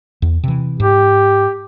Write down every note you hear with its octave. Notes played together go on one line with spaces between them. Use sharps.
E2
C3 E3
G#2 G4